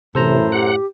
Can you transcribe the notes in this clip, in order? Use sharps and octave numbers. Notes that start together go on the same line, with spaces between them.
F#2 A2 C3 E3 A4 C5 A#5
G4 F#5